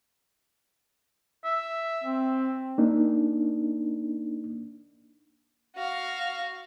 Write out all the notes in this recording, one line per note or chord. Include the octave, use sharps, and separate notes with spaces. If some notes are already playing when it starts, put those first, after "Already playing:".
E5
C4
A#3 D4 D#4
F#4 F5